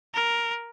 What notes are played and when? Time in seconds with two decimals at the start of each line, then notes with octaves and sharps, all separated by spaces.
0.14 A#4